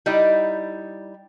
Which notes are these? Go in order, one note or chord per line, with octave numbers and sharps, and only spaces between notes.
G3 D#4 E4 D5 D#5